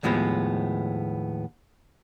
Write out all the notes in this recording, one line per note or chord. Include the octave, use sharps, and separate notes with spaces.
D#2 A2 F3 G#3 B3